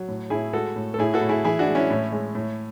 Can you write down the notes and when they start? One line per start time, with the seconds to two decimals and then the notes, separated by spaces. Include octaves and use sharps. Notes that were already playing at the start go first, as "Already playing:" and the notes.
Already playing: F#3
0.08 A2
0.30 A2 E4 G#4
0.53 G#3 F#4 A4
0.76 A2
0.94 A4
0.99 A2 E4 G#4
1.14 F#4 A4
1.21 A2
1.29 E4 G#4
1.45 E3 E4 G#4
1.59 D4 F#4
1.68 G#3
1.75 C#4 E4
1.90 A2
2.12 G#3
2.35 A2